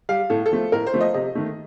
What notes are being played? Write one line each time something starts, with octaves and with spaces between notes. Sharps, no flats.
G3 F5
A2 A4
A4
F3 A3
A2 A#4
C5
F3 A3
D#5
C3 D#5
D#3 A3